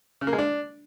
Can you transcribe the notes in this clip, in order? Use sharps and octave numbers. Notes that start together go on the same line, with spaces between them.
C#3
A#3
G#3
D4